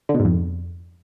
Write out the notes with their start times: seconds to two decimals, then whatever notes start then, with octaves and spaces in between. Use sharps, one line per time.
0.09 D3
0.14 B2
0.20 G#2
0.25 F2